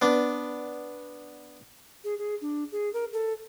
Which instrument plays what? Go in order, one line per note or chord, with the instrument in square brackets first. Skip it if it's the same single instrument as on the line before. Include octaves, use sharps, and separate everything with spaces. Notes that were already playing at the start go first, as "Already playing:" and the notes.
[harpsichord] B3 D4
[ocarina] G#4
G#4
D4
G#4
A#4
A4